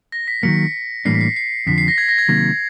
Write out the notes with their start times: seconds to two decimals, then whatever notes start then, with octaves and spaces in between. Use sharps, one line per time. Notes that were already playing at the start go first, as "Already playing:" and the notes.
0.12 A#6
0.28 B6
0.43 D#3 F#3 A#3 B6 C#7
1.05 A2 E3 G3 A#3 D4 C7
1.15 B6
1.21 C7
1.36 C7
1.67 F2 D3 F3 B6
1.78 C7
1.88 A#6
1.98 G#6
2.09 A#6
2.18 G#6
2.29 C3 D#3 F#3 A#3